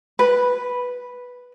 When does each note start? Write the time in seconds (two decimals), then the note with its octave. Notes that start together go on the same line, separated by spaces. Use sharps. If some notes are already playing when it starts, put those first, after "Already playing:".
0.19 B4